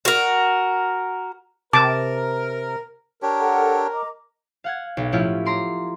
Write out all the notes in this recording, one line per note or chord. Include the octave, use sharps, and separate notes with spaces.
F#4 A#4
C3 A#4 A5 D6
D4 G4 A#4 C#5
A4 F#5
D#5 A#5 D6
F5 F#5 G#6
B1
A2 F3 C#4 E4 F4 G4
A#5 C6 D6